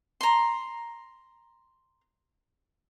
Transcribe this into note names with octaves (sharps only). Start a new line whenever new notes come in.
A#5 C6